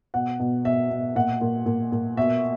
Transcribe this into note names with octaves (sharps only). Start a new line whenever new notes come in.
B2 F#5
B2
B2 E5
B2
A#2 F#5
A#2
A#2
A#2
B2 E5